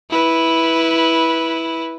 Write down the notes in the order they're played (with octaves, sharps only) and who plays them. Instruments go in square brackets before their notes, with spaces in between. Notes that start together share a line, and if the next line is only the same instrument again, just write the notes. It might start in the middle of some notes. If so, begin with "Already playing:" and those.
[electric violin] E4 B4